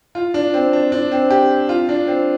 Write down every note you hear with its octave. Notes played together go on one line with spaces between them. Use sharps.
F4
D4
C4
D4
D4
C4
G4
F4
D4
C4